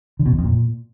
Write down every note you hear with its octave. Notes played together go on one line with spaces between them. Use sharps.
D3
B2
E2
F2
A#2